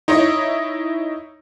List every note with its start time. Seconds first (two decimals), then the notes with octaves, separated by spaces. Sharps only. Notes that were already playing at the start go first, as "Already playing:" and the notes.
0.08 D#4 E4 C#5 D#5